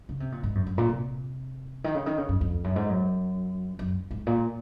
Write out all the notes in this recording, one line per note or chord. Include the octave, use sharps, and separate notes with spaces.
C#3
C3
A#2
G#2
F#2
F#2
A#2
C3
D#3
C#3
D#3
C#3
F#2
F2
F#2
G#2
F#2
F#2
G#2
A#2